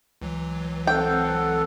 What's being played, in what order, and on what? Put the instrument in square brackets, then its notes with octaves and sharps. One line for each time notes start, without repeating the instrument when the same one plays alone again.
[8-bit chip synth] C#2 E3 F#3
[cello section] C4 [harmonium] A4 F#5 [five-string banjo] G5